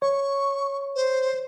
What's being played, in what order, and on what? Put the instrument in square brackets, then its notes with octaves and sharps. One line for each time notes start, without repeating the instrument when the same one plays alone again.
[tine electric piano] C#5 [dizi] C#6
[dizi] C5